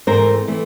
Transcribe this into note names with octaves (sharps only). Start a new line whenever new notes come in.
G#2 E3 A3 C4 A#4 C5
E3 A3 C4